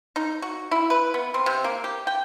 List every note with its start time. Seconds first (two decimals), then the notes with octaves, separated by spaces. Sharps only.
0.16 D#4
0.42 F#4
0.71 E4
0.90 B4
1.14 B3
1.34 C4
1.46 C3
1.64 A#3
1.84 G4
2.07 G5